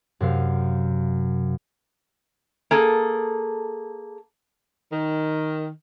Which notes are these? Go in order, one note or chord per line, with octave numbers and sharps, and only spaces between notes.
F#2 C3 F5
A#3 G#4 A4
D#3